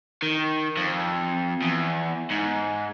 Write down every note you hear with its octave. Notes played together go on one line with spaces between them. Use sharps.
D#3
F2
E2
G#2